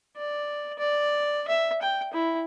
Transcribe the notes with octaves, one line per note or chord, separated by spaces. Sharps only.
D5
D5
E5
G5
E4